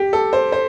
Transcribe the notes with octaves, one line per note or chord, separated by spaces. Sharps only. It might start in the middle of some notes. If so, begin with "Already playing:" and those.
Already playing: G4
A4
C5
C5